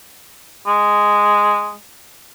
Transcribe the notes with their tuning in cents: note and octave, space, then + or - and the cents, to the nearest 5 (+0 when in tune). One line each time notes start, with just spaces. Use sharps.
G#3 -5